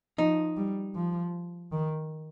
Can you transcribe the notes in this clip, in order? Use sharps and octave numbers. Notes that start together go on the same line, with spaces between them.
F3 D#4
G3
F3
D#3